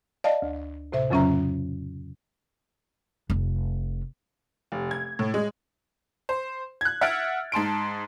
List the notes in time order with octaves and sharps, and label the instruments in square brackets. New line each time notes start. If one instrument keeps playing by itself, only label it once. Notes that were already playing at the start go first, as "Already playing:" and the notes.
[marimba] D5 D#5 F5 A5
D2
A2 C3 C5 E5
F2 C#3 F#3 C#4 E5 A#5
[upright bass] F1
[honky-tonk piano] F1
G#6
A2
G#3
C5
F#6 G#6
E5 F#5 F6 A6 D7
G#2 A5 C6 D7